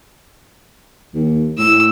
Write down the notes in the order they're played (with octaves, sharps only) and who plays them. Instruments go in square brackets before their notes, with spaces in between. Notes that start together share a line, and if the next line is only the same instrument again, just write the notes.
[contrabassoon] D#2
[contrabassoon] A2 [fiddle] E6